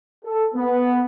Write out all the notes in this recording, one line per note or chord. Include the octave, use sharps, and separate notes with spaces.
A4
B3